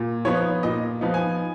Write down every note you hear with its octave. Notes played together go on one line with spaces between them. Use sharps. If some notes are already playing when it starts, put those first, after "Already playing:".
Already playing: A#2
F3 B3 D#4 C#5
A#2 D#5
F3 B3 D#4
G#5